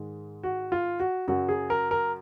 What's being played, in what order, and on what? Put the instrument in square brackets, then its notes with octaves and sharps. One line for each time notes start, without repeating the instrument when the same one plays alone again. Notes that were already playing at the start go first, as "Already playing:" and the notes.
Already playing: [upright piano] G#2 D#3 G#3
F#4
F4
F#4
F#2 C#3 F#3 F#4
G#4
A#4
A#4